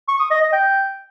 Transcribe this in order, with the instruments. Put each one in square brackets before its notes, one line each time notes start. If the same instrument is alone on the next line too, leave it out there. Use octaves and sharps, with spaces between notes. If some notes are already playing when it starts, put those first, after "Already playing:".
[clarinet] C#6
D#6
D#5
D#5
G5